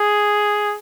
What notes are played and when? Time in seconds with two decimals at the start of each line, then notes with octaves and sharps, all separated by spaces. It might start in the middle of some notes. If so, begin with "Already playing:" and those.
Already playing: G#4